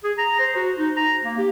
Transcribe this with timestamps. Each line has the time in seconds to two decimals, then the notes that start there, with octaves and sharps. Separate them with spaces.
0.04 G#4
0.18 A#5
0.40 C5
0.56 F#4
0.78 D#4
0.97 A#5
1.24 A#3
1.38 G4